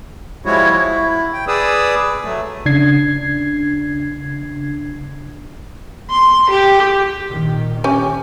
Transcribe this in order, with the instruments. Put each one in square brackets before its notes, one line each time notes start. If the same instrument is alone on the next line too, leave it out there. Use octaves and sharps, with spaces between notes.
[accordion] F3 G3 G#3 E4 F#4 C#5
E4
G5
G#4 B4 D5 D#6 E6
F#3 A3
[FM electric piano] C#3 D4 G#6 C7
[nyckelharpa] C6
G4
[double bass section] A#2 D#3
[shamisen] C#4 G4 G#5